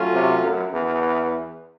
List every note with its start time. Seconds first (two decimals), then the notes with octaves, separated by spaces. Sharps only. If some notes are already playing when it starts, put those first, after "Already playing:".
Already playing: F#3 A3 C#4 F4 A4
0.13 C3
0.43 F#2
0.73 E2